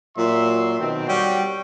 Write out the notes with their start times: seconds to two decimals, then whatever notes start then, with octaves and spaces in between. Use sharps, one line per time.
0.16 A#2 F#3 E5 C6
0.78 B2 D#3 C4
1.08 G3 F#4 C#5 G5